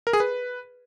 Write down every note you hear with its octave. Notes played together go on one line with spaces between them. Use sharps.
A#4
G#4
B4